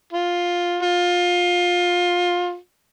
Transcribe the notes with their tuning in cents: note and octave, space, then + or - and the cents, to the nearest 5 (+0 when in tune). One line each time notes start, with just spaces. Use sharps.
F4 +10
F4 +20